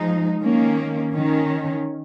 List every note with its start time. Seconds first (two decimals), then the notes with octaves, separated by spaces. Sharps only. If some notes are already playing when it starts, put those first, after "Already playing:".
Already playing: F3 G#3 D#4
0.43 D#3 A#3 C#4
1.13 D#3 C#4